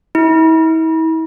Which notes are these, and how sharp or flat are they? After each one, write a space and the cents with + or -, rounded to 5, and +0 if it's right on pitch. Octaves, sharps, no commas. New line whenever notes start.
E4 -40